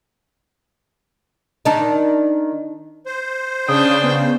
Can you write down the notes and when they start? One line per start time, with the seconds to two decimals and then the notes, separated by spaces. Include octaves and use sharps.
1.65 D#3 D4 D#4
3.06 C5
3.68 C#3 D4 G5 D#6
4.04 B3